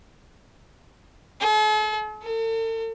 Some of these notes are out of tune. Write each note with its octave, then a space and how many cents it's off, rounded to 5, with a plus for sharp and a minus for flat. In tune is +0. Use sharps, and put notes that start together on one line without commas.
A4 -45
A4 +45